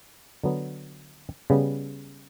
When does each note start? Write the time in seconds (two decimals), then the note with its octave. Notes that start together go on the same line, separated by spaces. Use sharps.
0.43 D3 F#3 B3
1.50 C#3 G3 B3